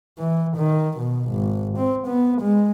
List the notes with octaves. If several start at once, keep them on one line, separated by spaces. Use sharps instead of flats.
E3
D#3
B2
G#1
C4
B3
G#3